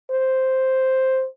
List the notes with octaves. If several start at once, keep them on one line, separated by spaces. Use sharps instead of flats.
C5